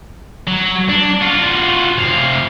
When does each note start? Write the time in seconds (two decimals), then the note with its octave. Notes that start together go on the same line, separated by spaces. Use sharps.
0.48 F#3
0.89 D4
1.22 F4 F#4
1.98 C3 F5